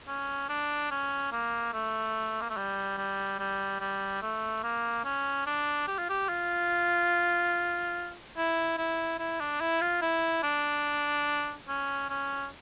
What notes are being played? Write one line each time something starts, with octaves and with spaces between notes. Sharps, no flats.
C#4
D4
C#4
A#3
A3
A#3
A3
G3
G3
G3
G3
A3
A#3
C#4
D4
G4
F4
G4
F4
E4
E4
E4
D4
E4
F4
E4
D4
C#4
C#4